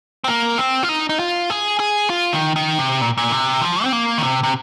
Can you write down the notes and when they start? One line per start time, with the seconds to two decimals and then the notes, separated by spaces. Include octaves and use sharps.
0.24 C4
0.28 A#3
0.58 C4
0.83 F4
0.89 D#4
1.09 D#4
1.19 F4
1.50 G#4
1.80 G#4
2.10 F4
2.33 D#3
2.56 D#3
2.79 C3
3.01 A#2
3.17 A#2
3.32 C3
3.61 F3
3.84 C4
3.92 A#3
4.18 D#3
4.23 C3
4.43 C3